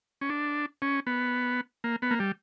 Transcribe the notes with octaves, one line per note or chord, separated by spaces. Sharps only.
C#4
D4
C#4
B3
A#3
B3
A#3
G3